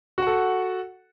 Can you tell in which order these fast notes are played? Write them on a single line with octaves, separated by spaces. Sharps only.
F#4 F#5 A4